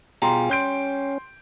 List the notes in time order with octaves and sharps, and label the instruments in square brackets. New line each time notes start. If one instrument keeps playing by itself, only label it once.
[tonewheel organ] B2 F4 G#4 [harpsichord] G3 [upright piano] A#5 C6
[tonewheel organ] C#4 [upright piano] C6 G6 D7